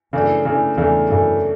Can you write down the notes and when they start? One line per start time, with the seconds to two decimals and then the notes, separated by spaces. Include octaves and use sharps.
0.13 F#2 C#3 E3 A3 D4
0.45 C#3 E3 A3 D4
0.77 E2 C#3 E3 A3 D4
1.09 F#2 C#3 E3 A3 D4